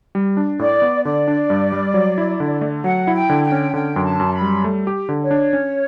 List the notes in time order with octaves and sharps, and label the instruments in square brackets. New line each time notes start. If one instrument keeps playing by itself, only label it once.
[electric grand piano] G3
D4
[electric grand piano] A2 [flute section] D5
[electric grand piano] B3
[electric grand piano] D3 [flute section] D5
[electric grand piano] D4
G2
G3
F#3
E4
D3
A3
[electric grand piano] F#3 [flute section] F#5
[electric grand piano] E4
[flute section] G5
[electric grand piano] D3
[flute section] G5
[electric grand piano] C#4
[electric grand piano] D3 [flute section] G5
[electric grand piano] F#2
[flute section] A5
[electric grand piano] F#2
[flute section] B5
[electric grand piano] G3
A3
G4
D3
[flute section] C#5
[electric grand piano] D4
C#4